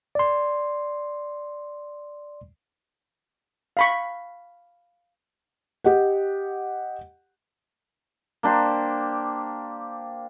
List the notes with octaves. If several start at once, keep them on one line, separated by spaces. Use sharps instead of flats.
D5 C6
F5 B5 C#6
G4 D#5 F#5
A#3 D4 G4 C5